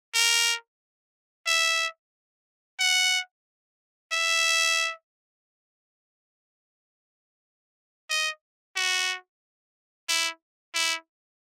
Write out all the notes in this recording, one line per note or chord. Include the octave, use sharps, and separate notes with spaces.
A#4
E5
F#5
E5
D#5
F#4
E4
E4